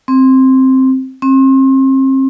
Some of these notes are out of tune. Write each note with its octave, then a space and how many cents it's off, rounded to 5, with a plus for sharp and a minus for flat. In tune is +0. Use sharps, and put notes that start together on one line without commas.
C4 +5
C4 +35